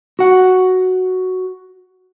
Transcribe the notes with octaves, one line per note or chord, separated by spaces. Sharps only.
F#4 F#5